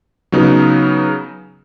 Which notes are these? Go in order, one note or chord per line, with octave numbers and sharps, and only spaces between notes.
C#3 F#3 B3 D#4